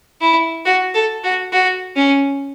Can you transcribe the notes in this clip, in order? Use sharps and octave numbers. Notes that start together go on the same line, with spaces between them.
E4
F#4
A4
F#4
F#4
C#4